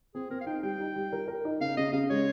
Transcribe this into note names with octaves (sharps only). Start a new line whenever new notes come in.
C4 G#4
C4 A#4
F5
D#4 G5
G3 G5
D#4
G3
A#4
A#4
D#4
C#3 F5
C#3 D#5
C#3 F5
G#3 C#5